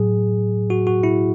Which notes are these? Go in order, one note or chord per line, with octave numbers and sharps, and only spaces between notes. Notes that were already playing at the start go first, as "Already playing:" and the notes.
Already playing: A2 F#3 G#4
F#4
F#4
E4